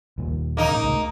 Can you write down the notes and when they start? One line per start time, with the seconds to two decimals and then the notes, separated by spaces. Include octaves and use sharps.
0.18 D#2 A#2 D#3
0.57 A#3 D#4
0.69 A2 C#3
0.83 C2 A3